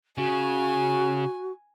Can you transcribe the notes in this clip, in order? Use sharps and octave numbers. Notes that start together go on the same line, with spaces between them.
C#3 F#4 G#5